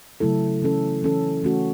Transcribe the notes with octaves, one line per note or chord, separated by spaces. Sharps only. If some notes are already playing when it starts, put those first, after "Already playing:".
C#3 F#3 A3 E4 A4
E3 C#4 A4
E3 C#4 A4
E3 A3 C#4 F#4